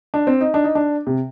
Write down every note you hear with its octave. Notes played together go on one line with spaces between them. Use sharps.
D4
C4
D#4
D4
D#4
D4
C3